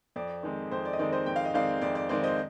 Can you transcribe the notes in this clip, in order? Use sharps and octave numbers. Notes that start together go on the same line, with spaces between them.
F2 D5
D#3 G#3 C4
F2 C5
D5
D#5
D#3 G#3 C4 D5
C5 D#5
F2 G5
F5
D#5
D#3 G#3 C4 D5 F5
F2 D5
D5
D#3 G#3 C4 D5
C5 D#5